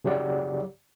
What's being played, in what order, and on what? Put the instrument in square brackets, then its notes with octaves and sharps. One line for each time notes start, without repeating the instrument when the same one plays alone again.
[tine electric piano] C#3 F#3 G4 D5 F#5